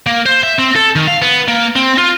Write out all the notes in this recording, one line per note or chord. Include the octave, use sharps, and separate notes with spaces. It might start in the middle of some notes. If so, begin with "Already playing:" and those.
A#3
C5
E5
C4
A4
D#3
F5
B3
A#3
C4
F4